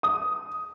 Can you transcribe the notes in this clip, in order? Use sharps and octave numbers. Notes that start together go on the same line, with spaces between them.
D#6